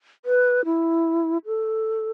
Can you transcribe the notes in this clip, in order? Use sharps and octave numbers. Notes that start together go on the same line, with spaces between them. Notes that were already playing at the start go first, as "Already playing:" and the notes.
B4
E4
A4